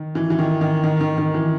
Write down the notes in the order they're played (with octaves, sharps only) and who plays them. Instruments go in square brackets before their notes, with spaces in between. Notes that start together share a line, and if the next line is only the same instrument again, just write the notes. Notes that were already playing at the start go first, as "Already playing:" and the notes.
Already playing: [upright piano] D#3
E3
E3
D#3
D#3
D#3
D#3
D#3
E3